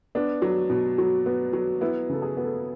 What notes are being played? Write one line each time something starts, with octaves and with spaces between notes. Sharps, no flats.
B3 D4
F#3
B2
F#3
B3
F#3
B3 E4
C#3 A4
G#4
B3
A4